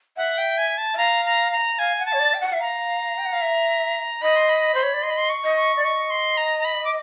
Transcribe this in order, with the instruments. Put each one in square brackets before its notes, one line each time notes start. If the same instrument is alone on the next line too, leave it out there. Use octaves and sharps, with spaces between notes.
[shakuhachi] E5 [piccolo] F#5
[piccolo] G5
G#5
A5
[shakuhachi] E5
[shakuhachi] F5 [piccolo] A#5
[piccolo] A#5
A#5
[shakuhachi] F5 [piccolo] G#5
[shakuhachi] F#5
[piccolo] A5
[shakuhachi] C#5
D5
G5
F#5
E5
[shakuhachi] F5 [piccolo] A#5
[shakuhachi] G5
F#5
F5
E5
[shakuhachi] D#5 [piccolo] B5
[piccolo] C6
B5
[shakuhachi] C5
C#5
D5
[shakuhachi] D#5 [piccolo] C6
[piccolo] B5
C6
C#6
[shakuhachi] D#5
[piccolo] C#6
[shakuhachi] D5
[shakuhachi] D#5 [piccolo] C#6
[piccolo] C6
A#5
A#5
B5
D6